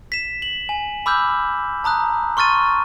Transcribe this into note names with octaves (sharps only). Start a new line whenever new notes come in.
B6 E7
F#7
G#5
B5 D6 E6 F6 G6
A5 A#5 D#6 F#6
C6 C#6 F6 A6 D#7